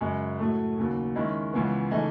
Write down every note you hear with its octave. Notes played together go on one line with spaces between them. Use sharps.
F#2 C#3 G#3
A2 F#3 A3
D#2 C#3 F#3
D#3 G#3 C#4 E4
C#2 C#3 E3 B3
C#3 E3 A3 D#4 G#4